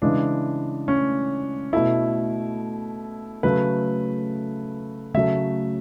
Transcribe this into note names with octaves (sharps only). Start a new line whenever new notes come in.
C#3 E3 G#3 D4
C#4
B2 A3 E4
C#3 F#3 A3 B4
C#3 F#3 A3 E5